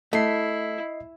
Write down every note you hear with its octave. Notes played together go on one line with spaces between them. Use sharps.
A3 E4 D#5 C7